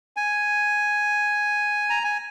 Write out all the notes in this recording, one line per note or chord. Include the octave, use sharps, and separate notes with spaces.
G#5
A#5
G#5